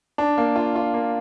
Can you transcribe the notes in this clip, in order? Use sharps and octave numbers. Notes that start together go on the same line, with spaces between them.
D4
A#3
F4
F4
A#3